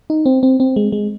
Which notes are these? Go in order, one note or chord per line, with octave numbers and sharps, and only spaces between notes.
D#4
C4
C4
C4
G#3
G#3